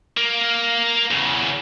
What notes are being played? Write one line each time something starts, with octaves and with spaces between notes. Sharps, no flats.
A#3
E2 C#3